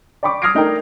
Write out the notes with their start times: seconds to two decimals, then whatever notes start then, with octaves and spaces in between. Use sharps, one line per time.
0.23 D5 G5 B5 C#6 D6
0.42 D#6 F6 G#6 A#6 C7 D7
0.54 A3 D4 D#4 A#4 D#5 G5